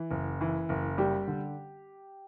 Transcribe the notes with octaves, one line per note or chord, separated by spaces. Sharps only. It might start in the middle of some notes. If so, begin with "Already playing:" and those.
Already playing: E3
F#1
E3
F#1
G3 G4
D3